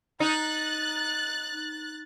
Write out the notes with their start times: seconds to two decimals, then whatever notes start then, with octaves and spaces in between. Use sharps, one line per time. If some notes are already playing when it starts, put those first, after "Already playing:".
0.20 D#4 F#6 A6